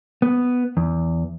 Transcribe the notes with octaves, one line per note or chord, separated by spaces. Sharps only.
B3
E2